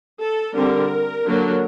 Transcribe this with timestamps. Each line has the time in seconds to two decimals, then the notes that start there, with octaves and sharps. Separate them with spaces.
0.20 A4
0.55 D3 G3 C4 A#4
1.26 D3 F#3 A#3 D4